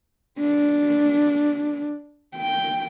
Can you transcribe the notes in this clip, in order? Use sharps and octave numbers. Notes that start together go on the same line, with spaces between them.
D4
G5